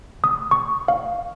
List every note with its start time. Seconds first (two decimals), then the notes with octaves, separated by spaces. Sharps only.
0.24 D#6
0.51 C#6
0.88 F5